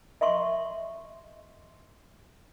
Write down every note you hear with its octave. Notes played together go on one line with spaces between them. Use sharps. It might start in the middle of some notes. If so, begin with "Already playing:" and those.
D#5 E5 C6 C#6